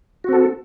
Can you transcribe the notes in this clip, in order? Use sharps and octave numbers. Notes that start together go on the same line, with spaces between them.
C4 F#4 A4